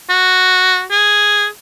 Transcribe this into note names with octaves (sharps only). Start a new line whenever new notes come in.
F#4
G#4